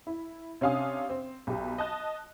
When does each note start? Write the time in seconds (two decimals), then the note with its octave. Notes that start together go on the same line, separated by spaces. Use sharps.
0.07 E4
0.61 C3 C#4 D4 F5 G#5 D#6
1.10 C4
1.47 B1 G4
1.78 D#5 A5 F#6